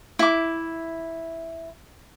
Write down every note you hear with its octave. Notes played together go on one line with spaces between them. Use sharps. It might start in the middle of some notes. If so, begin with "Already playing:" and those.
E4 D6